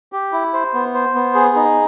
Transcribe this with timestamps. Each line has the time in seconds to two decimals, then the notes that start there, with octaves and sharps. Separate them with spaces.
0.12 G4
0.32 E4
0.54 C5
0.74 B3
0.94 C5
1.15 B3
1.35 G#4
1.56 D#4